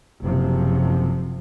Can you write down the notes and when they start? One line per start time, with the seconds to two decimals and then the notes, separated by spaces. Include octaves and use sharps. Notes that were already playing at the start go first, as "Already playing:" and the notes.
0.21 F#1 C3 F3